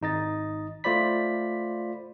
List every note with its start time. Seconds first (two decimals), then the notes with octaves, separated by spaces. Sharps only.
0.01 G#1 D#4 D#5 A6
0.84 A3 F4 C5 D5 B5 B6